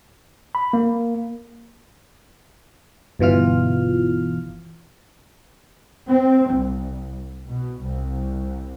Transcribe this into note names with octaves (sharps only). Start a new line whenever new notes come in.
B5
A#3
G1 B2 E3 F4 F6
C4
C2
B2
C2